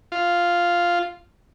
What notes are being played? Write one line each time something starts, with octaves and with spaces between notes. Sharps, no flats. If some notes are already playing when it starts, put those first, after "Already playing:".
F4